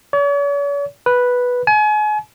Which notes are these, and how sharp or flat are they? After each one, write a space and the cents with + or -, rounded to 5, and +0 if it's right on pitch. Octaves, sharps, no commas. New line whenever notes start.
C#5 +45
B4 -5
G#5 +35